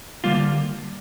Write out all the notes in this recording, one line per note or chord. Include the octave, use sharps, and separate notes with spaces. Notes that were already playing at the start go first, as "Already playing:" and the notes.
D3 G3 A#3 F4